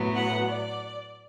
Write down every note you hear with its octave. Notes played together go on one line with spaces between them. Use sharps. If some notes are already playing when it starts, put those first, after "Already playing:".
Already playing: A2 F#3 B3
F#5
D5